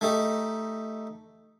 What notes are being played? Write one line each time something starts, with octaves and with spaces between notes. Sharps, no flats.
A3 D#4 G4